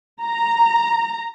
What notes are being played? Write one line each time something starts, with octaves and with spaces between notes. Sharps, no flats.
A#5